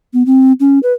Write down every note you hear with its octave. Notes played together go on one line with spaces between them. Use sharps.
B3
C4
C#4
B4